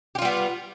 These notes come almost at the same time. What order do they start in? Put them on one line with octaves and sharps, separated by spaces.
G4 F4 G3 B3